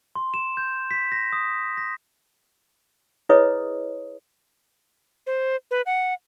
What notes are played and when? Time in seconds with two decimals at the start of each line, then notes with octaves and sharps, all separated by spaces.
0.15 C6
0.34 E7
0.57 G6
0.91 B6
1.12 A#6
1.33 D#6
1.77 A#6
3.29 E4 G#4 B4 C#5 D#5 D#6
5.27 C5
5.71 B4
5.86 F#5